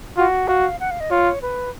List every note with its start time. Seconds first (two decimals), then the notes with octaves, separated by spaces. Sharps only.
0.17 F4 F#4
0.48 F#4 F5
0.80 F#5
0.91 F5
1.00 D#5
1.11 F4 C#5
1.42 B4